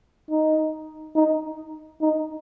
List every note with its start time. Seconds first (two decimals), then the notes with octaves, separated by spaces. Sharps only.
0.30 D#4
1.15 D#4
2.01 D#4